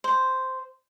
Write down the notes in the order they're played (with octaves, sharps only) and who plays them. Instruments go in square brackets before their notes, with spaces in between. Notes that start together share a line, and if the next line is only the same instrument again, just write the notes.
[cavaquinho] C5